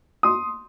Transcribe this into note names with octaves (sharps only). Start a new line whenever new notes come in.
C6 D#6